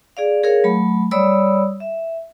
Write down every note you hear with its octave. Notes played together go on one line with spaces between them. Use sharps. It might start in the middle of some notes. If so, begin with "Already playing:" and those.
G#4 D5 F5
G#4 A#4 C#5 F5
F#3 A3 B5
G3 C#5 D5 B5 D#6 E6
E5